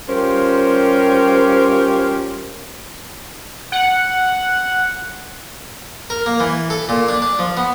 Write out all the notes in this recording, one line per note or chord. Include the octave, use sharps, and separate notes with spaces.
G3 C#4 F4 G4 A#4 C5
F#5
A#4
A#3
E3
A4
A#2
D4
D4
F3
B3